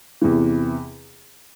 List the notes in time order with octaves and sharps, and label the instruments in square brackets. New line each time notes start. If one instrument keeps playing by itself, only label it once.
[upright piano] E2 C3 E3